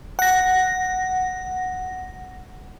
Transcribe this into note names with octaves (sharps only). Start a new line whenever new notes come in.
F#5 A#6